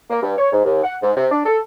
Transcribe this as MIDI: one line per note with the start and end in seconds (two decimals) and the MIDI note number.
0.10 0.19 58
0.22 0.33 43
0.38 0.50 73
0.52 0.62 44
0.65 0.80 39
0.83 0.96 78
1.02 1.11 44
1.16 1.25 48
1.31 1.45 62
1.45 1.58 69